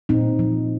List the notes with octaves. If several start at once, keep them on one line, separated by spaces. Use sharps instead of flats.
A#2 C4 D#4
F3